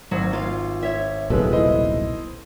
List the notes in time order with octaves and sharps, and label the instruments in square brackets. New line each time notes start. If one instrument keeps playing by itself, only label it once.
[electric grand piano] G#1 C5 [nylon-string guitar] F#3
[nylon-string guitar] F4 F5
C#5 E5
[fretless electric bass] D#1 B1 C3 [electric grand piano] F3 G#3 [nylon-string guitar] A4 B4
[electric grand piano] E4 C5 D#5